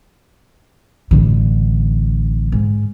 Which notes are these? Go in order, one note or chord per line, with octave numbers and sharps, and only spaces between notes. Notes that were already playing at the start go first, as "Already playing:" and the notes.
A1 D3
G#2